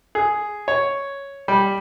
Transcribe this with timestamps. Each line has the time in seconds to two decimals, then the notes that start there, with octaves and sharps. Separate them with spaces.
0.15 G#4
0.68 C#5
1.48 G3